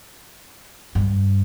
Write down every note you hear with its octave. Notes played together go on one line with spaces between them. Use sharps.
G2